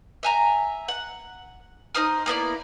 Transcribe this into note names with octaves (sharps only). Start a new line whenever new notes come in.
E5 G#5 A#5
F#5
D#4 C5 D#6 F6
A#3 B3 E4 D5